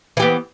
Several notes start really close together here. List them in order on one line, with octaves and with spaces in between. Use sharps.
E3 G4 B3